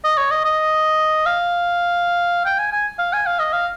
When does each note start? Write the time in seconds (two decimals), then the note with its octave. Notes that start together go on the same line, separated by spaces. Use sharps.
0.04 D#5
0.17 C#5
0.31 D#5
0.45 D#5
1.26 F5
2.46 G5
2.59 G#5
2.72 G#5
2.99 F5
3.13 G#5
3.27 F5
3.39 D#5
3.53 F5